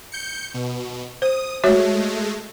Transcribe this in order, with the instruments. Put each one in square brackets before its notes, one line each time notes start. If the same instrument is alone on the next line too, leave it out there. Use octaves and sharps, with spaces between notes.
[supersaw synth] G6 C#7
B2
[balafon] C5 [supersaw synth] D#6
[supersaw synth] G#3 A3 [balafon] F#4 C#5 E5